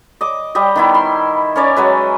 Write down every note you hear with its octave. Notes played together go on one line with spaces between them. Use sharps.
D#5 D6
G3 G4 D#5
D#3 B3 E4
C6
C#4 A#4 C#5 D5
F#3 G#3 B4